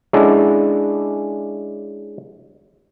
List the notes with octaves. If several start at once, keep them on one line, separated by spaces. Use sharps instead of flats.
G#3 C#4 D4 E4 A4 F#5